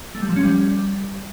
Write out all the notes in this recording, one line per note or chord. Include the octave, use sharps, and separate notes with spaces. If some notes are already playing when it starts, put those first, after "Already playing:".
A3
G3
F3
C#4
G3